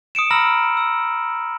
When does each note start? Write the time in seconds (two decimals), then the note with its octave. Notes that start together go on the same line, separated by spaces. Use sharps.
0.15 D#6 C#7 D7 E7
0.31 A#5 B5 E6 F6 A#6 F#7
0.77 E6